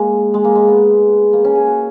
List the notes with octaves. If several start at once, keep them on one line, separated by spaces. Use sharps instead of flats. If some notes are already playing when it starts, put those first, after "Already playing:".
Already playing: G#3 A#3
G#3
A#3
G#3
B3
A#3
C#4
G#4
F#4